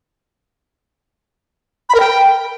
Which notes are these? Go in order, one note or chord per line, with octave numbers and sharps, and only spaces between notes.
B5
A#4
G5